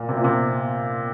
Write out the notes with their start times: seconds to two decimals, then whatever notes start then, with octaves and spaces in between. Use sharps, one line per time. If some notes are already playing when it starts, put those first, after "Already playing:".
Already playing: A#2
0.09 C3
0.17 A#2
0.24 C3